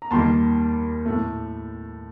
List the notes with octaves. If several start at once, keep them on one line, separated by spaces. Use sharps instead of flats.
A#5
D#2 D#3 G3 A#3 A5 C6
A2 A3